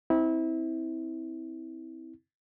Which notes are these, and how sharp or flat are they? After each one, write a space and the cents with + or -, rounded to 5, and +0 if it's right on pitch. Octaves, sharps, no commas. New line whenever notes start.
C4 -10 E4 -25